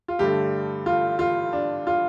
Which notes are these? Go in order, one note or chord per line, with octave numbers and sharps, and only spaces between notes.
F4
G2 D3 A3 G4
F4
F4
D4
F4